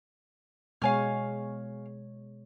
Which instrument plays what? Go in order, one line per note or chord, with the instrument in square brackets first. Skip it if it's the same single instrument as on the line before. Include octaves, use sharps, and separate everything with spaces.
[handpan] B2 G#3 C#5 [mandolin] F5 G#5 F6